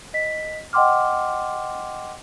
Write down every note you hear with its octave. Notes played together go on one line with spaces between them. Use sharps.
D#5 B6
D#5 F#5 G5 C6 D6 F6